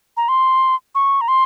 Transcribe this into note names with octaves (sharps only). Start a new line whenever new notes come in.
A#5
C6
C#6
A#5
C6